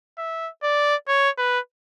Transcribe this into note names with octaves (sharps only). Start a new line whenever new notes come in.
E5
D5
C#5
B4